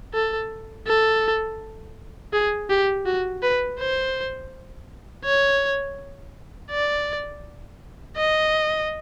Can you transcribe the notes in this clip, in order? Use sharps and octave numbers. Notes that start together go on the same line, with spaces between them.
A4
A4
G#4
G4
F#4
B4
C5
C#5
D5
D#5